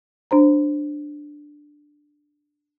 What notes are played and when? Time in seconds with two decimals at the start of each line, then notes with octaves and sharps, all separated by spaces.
0.31 D4 C5 A#5